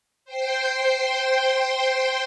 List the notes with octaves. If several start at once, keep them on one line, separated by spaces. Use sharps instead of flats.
C5 G5 C6